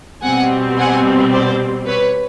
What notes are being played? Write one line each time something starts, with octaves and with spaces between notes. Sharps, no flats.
B2 G3 C4 F#5 G#5
F#5 G#5
C5 D5
B4 C#5